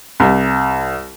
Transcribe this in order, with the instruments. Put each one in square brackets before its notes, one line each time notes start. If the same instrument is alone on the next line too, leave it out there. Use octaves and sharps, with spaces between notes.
[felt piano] C2